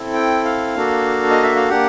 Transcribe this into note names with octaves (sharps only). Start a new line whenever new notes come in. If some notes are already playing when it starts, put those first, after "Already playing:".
Already playing: C4 E4 A4
G5
F5
A#3 D4 F#4 A4
D#5
E5
F5
A#3 D4 G4 F#5